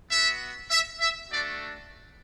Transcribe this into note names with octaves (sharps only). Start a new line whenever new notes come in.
B3 F#4 E5
E5
E5
A3 D4 F#4 D5